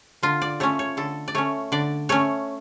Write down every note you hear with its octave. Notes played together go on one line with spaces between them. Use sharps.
D3 F4
D5
A3 C#4 C#5
C#5
D3 A4
D5
A3 C#4 C#5
D3 D5
A3 C#4 C#5